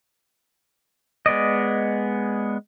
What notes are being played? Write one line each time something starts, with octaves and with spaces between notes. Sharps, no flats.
G#3 B3 D5 D#5